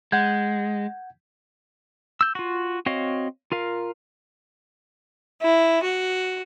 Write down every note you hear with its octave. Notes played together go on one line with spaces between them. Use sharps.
G#3 F#5 G6 G#6
E6 G6
F4 F#4
C4 F#4 C#5 D#5 F5
F4 A#4 F5
E4
F#4